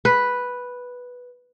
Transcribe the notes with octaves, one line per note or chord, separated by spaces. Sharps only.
B4